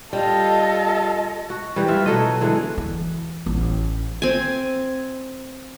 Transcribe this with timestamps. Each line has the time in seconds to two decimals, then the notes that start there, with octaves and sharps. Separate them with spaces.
0.13 G3 F4 A4 D#5
1.50 F#4
1.76 E3 G3
1.88 F4 E5
2.06 B2 F#3 A4 D#5
2.41 D3 E3 G#3 D4
2.78 E3
3.46 A1
4.22 C4 G#5